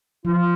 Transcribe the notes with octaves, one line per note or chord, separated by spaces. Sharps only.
F3 F4